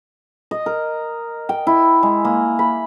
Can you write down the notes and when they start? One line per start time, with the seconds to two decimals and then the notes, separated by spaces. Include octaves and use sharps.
0.51 D#5
0.66 A#4
1.49 G5
1.67 E4
2.03 G#3
2.25 A#3
2.59 B5